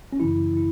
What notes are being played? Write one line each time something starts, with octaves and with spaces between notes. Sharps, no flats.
C#4
F#2 C#3 E3 E4
E4